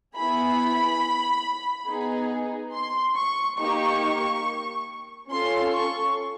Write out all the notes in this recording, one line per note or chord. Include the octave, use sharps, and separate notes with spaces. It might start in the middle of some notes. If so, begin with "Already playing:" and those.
B3 E4 G#4 B5
B3 D#4 G#4
C6
C#6
A#3 D#4 G4 C#6
C#4 F4 A4 C6
C#6